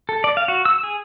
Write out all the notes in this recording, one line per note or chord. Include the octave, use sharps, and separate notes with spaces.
A4
D5
F5
F#4
E6
G#4